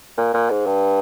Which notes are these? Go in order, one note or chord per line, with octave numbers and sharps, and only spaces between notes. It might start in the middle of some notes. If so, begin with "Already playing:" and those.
A#2
A#2
G#2
G2